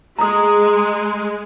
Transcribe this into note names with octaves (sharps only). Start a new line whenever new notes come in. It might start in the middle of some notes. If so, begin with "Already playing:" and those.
G#3 A#5 D#6